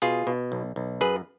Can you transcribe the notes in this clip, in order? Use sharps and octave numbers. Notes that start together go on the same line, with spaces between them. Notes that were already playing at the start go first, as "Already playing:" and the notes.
B2 F4 G#4
B2
B1
B1
F#2 G#4 B4